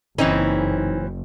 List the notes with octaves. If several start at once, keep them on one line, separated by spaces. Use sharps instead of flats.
F#1 E3 C4 C#4 D#4